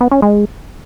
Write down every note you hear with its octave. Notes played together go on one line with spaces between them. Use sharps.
B3
C#4
G#3